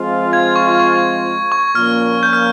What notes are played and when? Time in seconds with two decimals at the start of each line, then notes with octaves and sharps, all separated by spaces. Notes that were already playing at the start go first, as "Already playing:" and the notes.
Already playing: F3 G#3 C4 F4
0.33 G#6
0.56 C#6
0.79 C#6
1.52 C#6
1.75 A#2 F3 A#3 C#4 F6
2.23 G6
2.33 F6